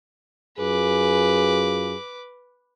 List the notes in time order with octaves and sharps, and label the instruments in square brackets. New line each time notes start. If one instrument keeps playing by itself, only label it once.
[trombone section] F#2 F4 G#4 [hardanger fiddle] B4 D6